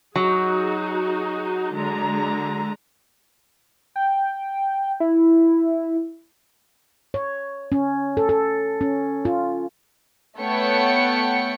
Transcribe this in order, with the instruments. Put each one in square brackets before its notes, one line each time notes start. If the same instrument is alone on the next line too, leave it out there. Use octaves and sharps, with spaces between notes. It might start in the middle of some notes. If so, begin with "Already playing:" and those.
[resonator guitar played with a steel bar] F#3 [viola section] D#4 F#4 G#4
[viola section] D3 G#3 A#5
[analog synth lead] G5
E4
[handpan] C#5
C#4
A4
A4
C#4
F4
[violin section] A3 B3 C#5 F#5 G5 C#7